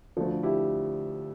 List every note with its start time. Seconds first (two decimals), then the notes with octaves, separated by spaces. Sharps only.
0.17 D2 D3 F3
0.43 E4 G4